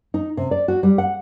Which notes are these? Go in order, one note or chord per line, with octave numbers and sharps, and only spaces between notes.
D#4
C3
D5
F#4
G3
F#5